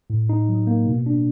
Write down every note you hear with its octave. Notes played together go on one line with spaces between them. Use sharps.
A2
D#4
F#3
A#3
B2
D4